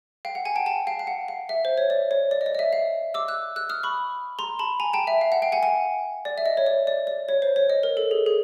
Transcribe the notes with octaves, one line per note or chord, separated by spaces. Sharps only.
F5 G5
F#5
F#5 G#5
G5 A5
G5 A5
F5 G5
F5
F#5
F5
E5
C5
C#5
D5
C#5
D5
D#5
D5
D#5
E5
F5
D6 E6
E6 F#6
E6 F#6
D#6 F6
B5 C#6
A#5 C6
A5 B5
G#5 A#5
G5 A5
E5
F5
F#5
F5 G5
F#5 G#5
F#5 G#5
D5
E5
D#5
C#5
D5
D5
D5
C#5
C5
C#5
D#5
A#4
A4
G#4
G#4